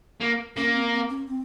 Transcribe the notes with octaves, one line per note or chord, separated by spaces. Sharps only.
A#3
A#3 C#4
C4
C4
C#4
C4